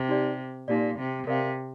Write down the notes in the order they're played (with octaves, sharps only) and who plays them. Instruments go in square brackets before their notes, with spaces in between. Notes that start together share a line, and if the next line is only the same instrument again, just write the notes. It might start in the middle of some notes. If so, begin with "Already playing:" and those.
Already playing: [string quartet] C3
[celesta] D#4 G4 D5
[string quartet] A#2 [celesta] D#4 G4 D5
[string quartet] C3
[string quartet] C3 [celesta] A#4 D5 F5